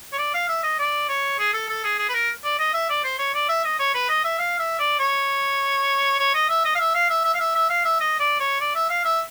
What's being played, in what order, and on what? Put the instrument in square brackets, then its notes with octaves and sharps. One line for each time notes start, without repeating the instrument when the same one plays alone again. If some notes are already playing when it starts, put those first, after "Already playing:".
[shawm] C#5
D5
F5
E5
D#5
D5
C#5
G#4
A4
A4
G#4
G#4
B4
A#4
D5
D#5
E5
D5
C5
C#5
D5
E5
D#5
C#5
B4
D#5
E5
F5
E5
D5
C#5
C#5
D#5
E5
D#5
F5
E5
F5
E5
E5
F5
E5
E5
F5
E5
D#5
D5
C#5
D5
E5
F5
E5